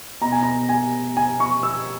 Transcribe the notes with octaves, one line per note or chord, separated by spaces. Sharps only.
B2 A#5
G#5
A#5
G#5
G#5
C#6
E6